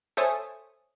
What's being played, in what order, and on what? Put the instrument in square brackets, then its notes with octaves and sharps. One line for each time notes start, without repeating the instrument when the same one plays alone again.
[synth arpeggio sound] A4 C5 C#5 E5 G#5 D#6